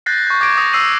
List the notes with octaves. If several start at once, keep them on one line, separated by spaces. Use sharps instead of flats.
F#6 G6 A6 A#6 C7
C#6 G6
C#6 D6 G#6 A#6 D7
D#6 A#6 C#7
D#6 E6 C7 D#7 F#7